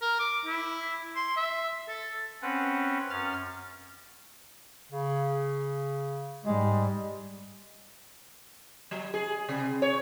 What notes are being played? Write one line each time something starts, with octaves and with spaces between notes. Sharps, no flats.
A#4
D6
E4
C6
E5
A4
C4 C#4 B4 F#5
F#2 C#4 F6 A6
C#3
G#2 G3 G#3
F#3
G#4
C3
C#5